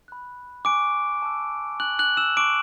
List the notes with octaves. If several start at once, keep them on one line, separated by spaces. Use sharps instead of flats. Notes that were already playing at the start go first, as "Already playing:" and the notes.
B5 F#6
G#5 C#6 D6 F#6 D7
A5 E6
G#5 C#6 F#6 F#7
F#6 F#7
E6 E7
A5 C#6 D6 E6 D7